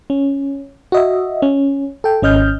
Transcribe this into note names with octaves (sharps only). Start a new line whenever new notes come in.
C#4
F#4 D#5 E5
C#4
A4 G5
G#1 C#4 D#5 F6 G6